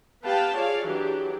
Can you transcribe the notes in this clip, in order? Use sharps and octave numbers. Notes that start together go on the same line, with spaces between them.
B3 G4 B4 F5 G5 A5
F4 G#4 C#5 D5 F5
E3 F#3 D4 G4 G#4